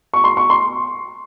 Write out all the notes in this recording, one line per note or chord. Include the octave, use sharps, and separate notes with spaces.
C#6
C6
C#6
C6